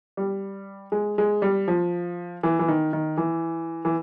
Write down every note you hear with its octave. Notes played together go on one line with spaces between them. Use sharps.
G3
G#3
G#3
G3
F3
E3
E3
D#3
D#3
E3
E3